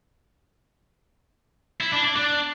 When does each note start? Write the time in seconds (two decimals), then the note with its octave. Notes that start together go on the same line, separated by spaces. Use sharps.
1.81 E4
1.93 D4
2.05 D5
2.17 D4